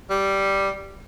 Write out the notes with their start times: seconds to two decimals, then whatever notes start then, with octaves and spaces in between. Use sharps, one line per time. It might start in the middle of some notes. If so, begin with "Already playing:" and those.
0.10 G3